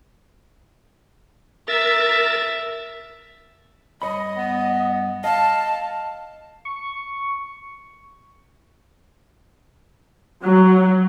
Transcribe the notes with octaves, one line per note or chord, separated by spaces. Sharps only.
A#4 E5 A6
G2 C#5 D#5 B5
B3
D#5 F5 A5
C#6
F#3